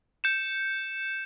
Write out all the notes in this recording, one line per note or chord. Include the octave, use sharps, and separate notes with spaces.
G6 C#7 E7